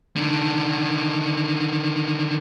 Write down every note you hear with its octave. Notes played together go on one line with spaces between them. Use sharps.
D3 D#3